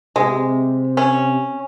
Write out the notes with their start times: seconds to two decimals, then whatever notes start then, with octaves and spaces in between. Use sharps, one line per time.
0.16 C3 G#3
0.97 C#4